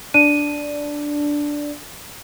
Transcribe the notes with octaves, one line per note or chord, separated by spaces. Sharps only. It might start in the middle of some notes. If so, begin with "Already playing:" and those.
D4 D#7